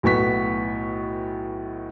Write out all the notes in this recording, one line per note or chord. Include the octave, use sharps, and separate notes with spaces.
B1 A2 B3 C#6 B6